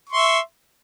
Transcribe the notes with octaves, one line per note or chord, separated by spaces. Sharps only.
E5 C6 C#6